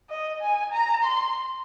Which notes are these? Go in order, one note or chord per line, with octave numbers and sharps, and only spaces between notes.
D#5
G#5
A#5
C6